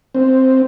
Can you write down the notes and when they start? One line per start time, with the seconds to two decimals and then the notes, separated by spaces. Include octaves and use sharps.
0.15 C4